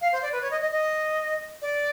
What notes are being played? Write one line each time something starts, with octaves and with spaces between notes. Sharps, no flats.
F5
C5
D5
B4
C#5
D#5
D#5
D#5
D5